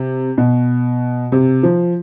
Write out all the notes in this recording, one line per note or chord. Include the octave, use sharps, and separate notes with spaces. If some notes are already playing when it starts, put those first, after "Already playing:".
Already playing: C3
B2
C3
F3